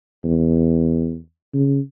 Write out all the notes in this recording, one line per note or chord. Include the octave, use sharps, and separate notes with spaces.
E2
C#3